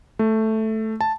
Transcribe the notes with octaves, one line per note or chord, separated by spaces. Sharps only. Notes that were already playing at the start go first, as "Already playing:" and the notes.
A3
A5